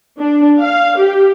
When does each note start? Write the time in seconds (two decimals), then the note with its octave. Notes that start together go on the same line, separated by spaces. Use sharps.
0.19 D4
0.60 F5
0.99 G4